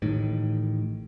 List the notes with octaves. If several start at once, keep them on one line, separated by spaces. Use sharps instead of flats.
A1 A2 D#3